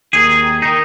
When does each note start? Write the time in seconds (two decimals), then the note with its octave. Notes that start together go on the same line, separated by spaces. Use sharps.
0.13 D#2 D#3 G#4
0.62 D#3 D#4